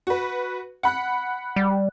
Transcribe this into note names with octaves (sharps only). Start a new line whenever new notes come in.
F#4 B4
F#5 B5 F#6
G3